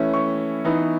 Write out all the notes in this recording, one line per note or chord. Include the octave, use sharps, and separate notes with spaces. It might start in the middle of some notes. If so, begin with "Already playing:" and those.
Already playing: E3 A3 C#4 E4
C#6
E3 B3 D#4